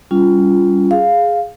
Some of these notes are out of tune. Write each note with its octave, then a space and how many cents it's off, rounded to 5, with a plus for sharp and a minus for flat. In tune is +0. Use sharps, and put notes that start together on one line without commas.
G3 +0 C#4 +25 F4 +0
G#4 +0 F5 +0